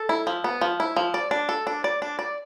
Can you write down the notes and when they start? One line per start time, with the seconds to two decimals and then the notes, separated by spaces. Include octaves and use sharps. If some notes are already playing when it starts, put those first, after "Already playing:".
Already playing: A4
0.09 E4
0.27 F3
0.44 B3
0.61 F3
0.80 E4
0.97 F3
1.14 D5
1.31 D4
1.49 A4
1.67 D4
1.84 D5
2.02 D4
2.19 D5